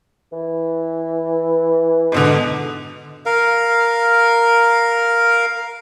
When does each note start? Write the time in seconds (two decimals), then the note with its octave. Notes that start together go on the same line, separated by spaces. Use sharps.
0.32 E3
2.12 G#2 B2 D3
3.26 A#4 F5